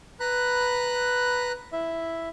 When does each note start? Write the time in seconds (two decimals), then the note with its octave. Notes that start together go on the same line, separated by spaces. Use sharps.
0.20 B4 A#5 B5 F#6
1.73 E4 E5